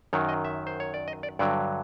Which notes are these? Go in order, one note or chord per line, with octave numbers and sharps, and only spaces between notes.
F#2 D#3 F#3 C#5
D#5
E5
C5
C#5
D5
D#5
D5
G2 D3 F#3 D5